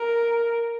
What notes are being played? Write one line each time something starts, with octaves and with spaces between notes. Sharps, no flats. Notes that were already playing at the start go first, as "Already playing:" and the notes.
Already playing: A#4